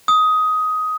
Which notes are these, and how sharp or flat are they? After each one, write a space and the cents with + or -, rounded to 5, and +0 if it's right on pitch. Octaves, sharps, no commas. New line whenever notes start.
D#6 +15